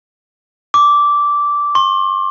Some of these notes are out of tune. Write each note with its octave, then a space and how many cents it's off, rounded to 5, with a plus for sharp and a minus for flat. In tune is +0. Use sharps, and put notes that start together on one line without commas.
D6 -10
C6 +40